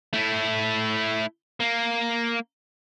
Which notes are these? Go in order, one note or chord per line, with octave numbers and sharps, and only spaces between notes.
A3 E4
A#3